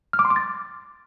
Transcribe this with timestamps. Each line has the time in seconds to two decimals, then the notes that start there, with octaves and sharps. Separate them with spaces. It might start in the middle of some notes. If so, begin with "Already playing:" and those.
0.13 F6
0.19 D6
0.25 C6
0.30 D6
0.36 A6